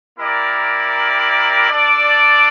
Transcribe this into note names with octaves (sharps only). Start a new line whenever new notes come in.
A#3 E4 G4 A#4 D5
D4 A4 D5